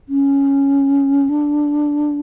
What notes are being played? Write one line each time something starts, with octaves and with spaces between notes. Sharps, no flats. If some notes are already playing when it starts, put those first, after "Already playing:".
C#4
D4